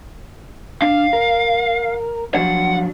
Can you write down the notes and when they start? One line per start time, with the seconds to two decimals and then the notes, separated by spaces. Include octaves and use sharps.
0.82 D4 F5
1.13 A#4
2.34 F3 F#3 D4 F#5